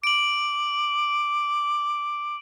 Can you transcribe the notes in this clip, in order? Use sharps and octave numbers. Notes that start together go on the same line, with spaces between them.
D6 D7 F#7